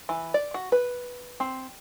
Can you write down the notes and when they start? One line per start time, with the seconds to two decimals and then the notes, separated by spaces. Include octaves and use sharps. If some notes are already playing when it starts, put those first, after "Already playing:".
0.09 E3
0.34 D5
0.54 F#4
0.72 B4
1.40 C4